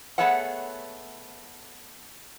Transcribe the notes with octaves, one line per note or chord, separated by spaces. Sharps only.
A3 B3 G#4 C#5 E5 F#5